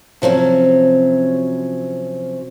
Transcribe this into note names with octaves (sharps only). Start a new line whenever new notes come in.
C3 F3 F#3 C#4